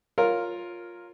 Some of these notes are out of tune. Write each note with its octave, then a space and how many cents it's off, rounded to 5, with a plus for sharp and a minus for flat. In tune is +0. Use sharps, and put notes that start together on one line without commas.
F4 +10 A#4 +0 C#5 +0